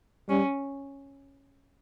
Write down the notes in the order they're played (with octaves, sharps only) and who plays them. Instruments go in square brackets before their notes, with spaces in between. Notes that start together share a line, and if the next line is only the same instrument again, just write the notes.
[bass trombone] G3 [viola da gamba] C#4